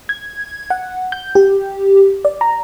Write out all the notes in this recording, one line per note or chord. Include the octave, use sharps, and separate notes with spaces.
G#6
F#5
G6
G4
D5
A#5